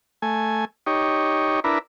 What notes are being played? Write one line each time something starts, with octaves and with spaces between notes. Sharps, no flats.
A3 G#5
D#4 G4 C#5
D4 E4 A#4 B4